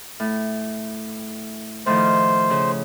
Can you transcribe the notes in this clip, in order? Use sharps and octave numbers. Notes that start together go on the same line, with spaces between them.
A2
A2 D#3 F3 C5
C#3